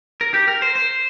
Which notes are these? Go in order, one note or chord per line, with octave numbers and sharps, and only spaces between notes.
A#4
G4
A#4
C5
C5